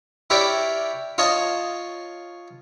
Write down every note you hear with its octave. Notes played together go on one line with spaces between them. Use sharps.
E4 G4 A#4 C#5 D5 E5
F4 C#5 D#5 F5 A5